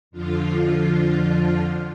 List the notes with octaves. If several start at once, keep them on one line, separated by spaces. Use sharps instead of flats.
F2 D3 F3 F4